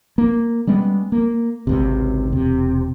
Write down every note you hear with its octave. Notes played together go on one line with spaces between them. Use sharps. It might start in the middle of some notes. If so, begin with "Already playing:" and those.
A#3
G3 G#3 B3 C#4
A#3
G#1 C#2 C3
E1 C3